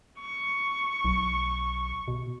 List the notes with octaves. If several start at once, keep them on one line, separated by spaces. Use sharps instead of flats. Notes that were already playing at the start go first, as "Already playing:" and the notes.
C#6
B1
B2